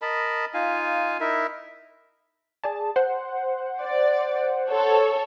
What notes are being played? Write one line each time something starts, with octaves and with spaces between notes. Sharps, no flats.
A#4 D#5 A5 B5
D#4 F4 F5 G#5
D#4 E4 A#4 E5
G#4 D5 A5
C5 F#5
D5
A4 C#5